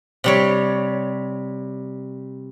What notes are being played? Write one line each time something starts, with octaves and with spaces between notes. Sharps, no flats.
C3 G3 C#5